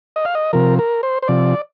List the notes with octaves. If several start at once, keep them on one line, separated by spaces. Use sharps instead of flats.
D#5
F5
D#5
C3 F3 A#4
A#4
C5
C5
C3 F3 D5